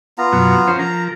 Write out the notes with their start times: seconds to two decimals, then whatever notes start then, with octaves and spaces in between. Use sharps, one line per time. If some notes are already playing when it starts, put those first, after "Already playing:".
0.18 B3 F4 A#5
0.33 F#2 B2 F#3
0.67 F3 C#4 C5
0.79 F3 A#4 A#5